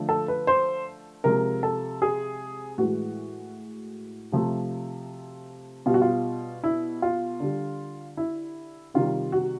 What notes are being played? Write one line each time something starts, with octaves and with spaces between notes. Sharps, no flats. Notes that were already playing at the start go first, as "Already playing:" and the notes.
Already playing: D3 F3 A3
A4
B4
C5
C3 F3 G#3 A#4
A4
G#4
A2 E3 G#3 F#4
C3 F3 A3
B2 G3 F4
F#4
F4
E4
F4
D3 G3
E4
C3 D#3 G3 F4
F#4